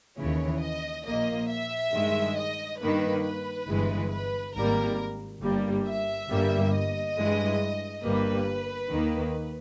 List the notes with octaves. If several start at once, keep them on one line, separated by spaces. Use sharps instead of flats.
D#2 C#3 E3 C#5
D#5
A#1 A#2 A#3 D#5
E5
G2 D#3 G#3
D#5
G2 D#3 A#3 B4
B4
G1 G2 E3 G#3
B4
G#1 G#2 G3 A#3 A#4
G1 G2 G3 A#3
E5
G1 G2 G3 A#3
D#5
G2 E3 G#3
G1 G2 G3 A#3 B4
D#2 D#3 A#3